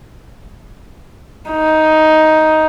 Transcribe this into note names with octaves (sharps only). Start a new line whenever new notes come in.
D#4